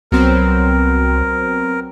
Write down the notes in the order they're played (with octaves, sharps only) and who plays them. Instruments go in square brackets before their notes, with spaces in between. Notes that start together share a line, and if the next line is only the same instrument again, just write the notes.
[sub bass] C2 [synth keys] F#3 B3 C4 [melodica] A#4